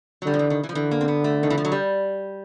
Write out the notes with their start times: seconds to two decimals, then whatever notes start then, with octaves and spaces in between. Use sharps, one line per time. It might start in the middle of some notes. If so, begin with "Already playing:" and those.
0.22 F#3
0.26 D3 G3
0.34 F3
0.39 E3
0.50 D#3
0.64 E3
0.69 F3
0.75 D3 E3
0.91 A#3
1.01 C4
1.08 B3
1.24 A3
1.43 D#3
1.50 E3
1.58 F3
1.65 F#3
1.72 G3